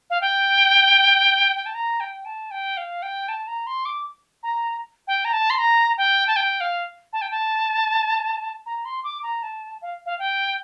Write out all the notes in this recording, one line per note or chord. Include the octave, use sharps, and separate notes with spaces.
F5
G5
G5
A5
A#5
G5
A5
G5
F5
G5
A5
A#5
C6
D6
A#5
G5
A#5
A5
C6
A#5
G5
A5
G5
F5
A5
G5
A5
A#5
C6
D6
A#5
A5
F5
F5
G5